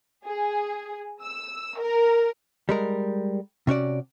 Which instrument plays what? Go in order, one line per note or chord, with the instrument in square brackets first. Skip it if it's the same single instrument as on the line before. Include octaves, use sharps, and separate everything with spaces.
[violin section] G#4
E6
A#4
[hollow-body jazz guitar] G3 G#3 A#4
C3 C#4 F#4 D5